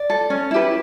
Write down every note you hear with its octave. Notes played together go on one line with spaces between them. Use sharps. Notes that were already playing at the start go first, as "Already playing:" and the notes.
Already playing: D5
A4
C#4
E4 G4 B4